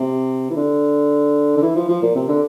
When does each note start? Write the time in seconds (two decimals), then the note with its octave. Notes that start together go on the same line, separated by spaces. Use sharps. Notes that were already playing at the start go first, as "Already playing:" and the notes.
Already playing: C3
0.50 E3
0.56 D3
1.57 D3
1.62 E3
1.75 F3
1.88 F3
2.02 A#2
2.15 C3
2.28 D3